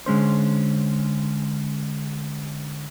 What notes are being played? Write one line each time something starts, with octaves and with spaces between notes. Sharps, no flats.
D3 G#3 C#4 C5